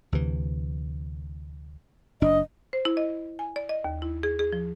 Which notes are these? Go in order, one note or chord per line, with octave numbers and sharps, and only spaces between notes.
D2 C3 E3
F#1 D4 D#5
C5
E4
D#5
G#5
D5
D#5
D#2
E4
G#4
G#4
F3